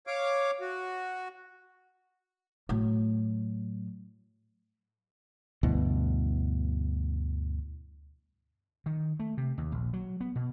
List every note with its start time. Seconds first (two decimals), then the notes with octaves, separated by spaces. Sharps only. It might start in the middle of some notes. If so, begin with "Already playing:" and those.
0.07 C#5 F5 D6
0.61 F#4
2.69 A2 F#3
5.63 D2 G2 B2 E3
8.86 D#3
9.20 A3
9.37 C3
9.58 D#2
9.72 A#1
9.93 F#3
10.21 B3
10.36 B2